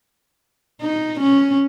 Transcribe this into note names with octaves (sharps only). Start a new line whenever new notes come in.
D#4
C#4